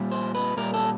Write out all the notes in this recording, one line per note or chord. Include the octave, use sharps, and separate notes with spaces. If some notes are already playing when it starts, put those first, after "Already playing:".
Already playing: A#2 G3
C5
B4
A#2 G3 A#4
A4